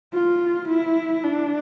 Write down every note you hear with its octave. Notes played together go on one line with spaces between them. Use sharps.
F4
E4
D4